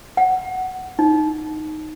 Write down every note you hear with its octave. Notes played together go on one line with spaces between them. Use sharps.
F#5
D#4